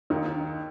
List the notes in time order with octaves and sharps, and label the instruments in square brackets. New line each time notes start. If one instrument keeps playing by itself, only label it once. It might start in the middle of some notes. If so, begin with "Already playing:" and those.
[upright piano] D#2 D#3 [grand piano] D#4